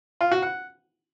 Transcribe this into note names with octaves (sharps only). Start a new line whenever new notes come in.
F4
F#4
F#5